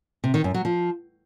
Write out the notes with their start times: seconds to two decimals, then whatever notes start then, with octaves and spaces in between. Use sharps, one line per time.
0.24 C3
0.34 D#3
0.44 F#2
0.54 F#3
0.65 F3